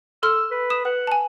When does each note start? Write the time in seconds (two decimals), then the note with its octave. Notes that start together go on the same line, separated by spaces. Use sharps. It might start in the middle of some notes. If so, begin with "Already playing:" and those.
0.23 A4 C6 E6 F6
0.51 B4
0.70 D#6 E7
0.85 B4 F#5
1.07 G#5 A5